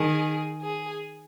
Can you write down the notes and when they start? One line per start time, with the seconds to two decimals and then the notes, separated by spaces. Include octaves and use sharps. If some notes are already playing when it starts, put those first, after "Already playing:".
Already playing: D#3 G#4
0.62 G#4